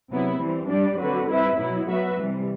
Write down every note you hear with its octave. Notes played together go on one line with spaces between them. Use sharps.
C3 F#3 B3 E4
E3 G3 C4
G3 D4 G4 D5
D3 F#3 C4 F#4 B4
G3 C4 E4 B4 E5
B2 F#3 B3 E4
F#3 B3 F#4 B4 E5
C3 E3 G3